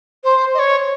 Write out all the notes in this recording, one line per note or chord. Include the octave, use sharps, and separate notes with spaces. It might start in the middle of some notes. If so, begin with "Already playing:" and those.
C5
D#5
C#5